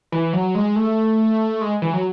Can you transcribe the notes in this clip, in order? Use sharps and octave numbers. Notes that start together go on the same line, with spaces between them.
E3
F#3
G#3
A3
G#3
E3
F#3